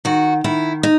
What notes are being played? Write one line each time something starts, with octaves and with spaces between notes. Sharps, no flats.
D#3 F#4
D#3 E4
D#4